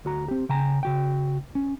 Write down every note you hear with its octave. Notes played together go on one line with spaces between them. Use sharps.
D2 F#4 A#5
C4 G4
C#3 G5 G#5 A#5
C#3 F#4 G5
C#4